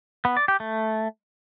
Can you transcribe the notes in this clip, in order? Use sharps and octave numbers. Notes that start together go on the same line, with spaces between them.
B3
D5
G4
A3